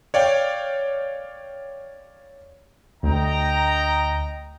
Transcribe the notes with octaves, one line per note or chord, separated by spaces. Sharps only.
C#5 D5 F5 G5
D2 D#5 G5 A#5